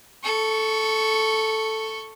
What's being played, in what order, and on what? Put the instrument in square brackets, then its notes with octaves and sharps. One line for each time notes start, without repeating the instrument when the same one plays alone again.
[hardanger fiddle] A4 C#6